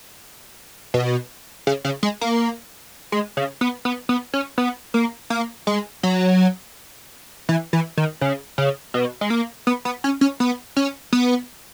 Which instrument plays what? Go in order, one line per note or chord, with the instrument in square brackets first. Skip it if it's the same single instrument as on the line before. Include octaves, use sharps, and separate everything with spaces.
[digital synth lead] B2
C#3
C#3
G#3
A#3
G#3
C#3
B3
B3
B3
C#4
B3
A#3
A#3
G#3
F#3
E3
E3
D#3
C#3
C#3
B2
G#3
A#3
B3
B3
C#4
C#4
B3
C#4
B3